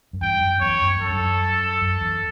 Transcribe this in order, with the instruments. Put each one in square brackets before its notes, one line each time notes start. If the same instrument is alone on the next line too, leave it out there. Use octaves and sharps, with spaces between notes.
[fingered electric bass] F#2
[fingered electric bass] E2 G2 [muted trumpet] G5
[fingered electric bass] F#2
[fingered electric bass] E2 [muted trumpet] C#5
[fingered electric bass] F#2
[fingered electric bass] F#2 [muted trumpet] A4
[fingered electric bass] G2
F#2
F#2
E2